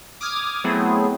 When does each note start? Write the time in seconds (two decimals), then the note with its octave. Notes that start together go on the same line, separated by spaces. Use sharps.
0.21 D6 D#6 F6 G#6
0.64 F#3 A3 B3 C4 E4 G#4